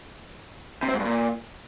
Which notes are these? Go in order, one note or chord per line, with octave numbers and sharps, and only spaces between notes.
C3
C4
G#2
G2
A#2